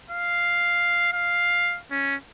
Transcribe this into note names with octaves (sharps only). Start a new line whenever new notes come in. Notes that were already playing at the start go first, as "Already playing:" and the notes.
F5
F5
C#4